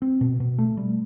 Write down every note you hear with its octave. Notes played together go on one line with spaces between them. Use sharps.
C4
B2
B2
A3
G3